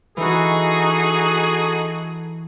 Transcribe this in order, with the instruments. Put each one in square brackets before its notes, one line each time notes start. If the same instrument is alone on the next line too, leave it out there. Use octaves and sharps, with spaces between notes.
[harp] E3 [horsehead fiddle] D#4 F#4 [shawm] G#4 [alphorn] A4